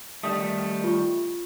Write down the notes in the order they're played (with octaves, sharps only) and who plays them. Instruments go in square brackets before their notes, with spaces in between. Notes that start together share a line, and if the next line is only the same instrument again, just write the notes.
[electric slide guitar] D#3 G3 A3 [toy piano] D#6
[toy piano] F4 C#6